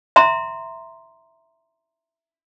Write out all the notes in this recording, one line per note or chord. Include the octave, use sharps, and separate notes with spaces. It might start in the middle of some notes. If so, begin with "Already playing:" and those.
E5 A#5 C6